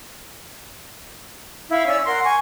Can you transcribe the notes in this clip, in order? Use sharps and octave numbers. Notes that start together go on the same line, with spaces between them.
E4 F5
C#4 D5 E6
A#4 F#5 C6
G#5 C#6